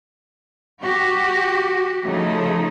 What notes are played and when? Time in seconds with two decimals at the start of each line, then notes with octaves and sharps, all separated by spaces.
0.82 F#4 G4
2.04 C#3 F3 A3 D#4